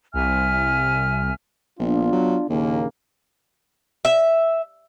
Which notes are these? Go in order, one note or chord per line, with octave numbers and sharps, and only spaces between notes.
C2 E5 G#5 F6
A#1 B3 D4 F4
F#3
A#1 D#2 C#3 A#3
E5